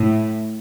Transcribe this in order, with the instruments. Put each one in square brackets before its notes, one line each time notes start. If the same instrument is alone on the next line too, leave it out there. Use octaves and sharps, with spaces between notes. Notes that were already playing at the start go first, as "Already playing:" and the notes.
Already playing: [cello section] A2